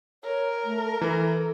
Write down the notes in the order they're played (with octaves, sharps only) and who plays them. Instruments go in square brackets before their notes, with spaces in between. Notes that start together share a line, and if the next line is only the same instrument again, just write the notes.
[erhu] A#4 [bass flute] C#5
[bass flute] A3
[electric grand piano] E3 [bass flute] A4